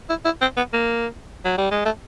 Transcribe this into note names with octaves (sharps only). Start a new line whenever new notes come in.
E4
E4
C4
B3
A#3
F#3
G3
G#3
A3